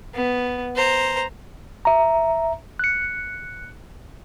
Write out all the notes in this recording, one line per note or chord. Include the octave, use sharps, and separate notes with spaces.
B3
C5 A#5
E5 A#5
F#6 C#7